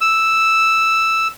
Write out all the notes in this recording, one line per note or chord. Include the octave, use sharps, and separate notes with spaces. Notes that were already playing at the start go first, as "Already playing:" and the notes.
E6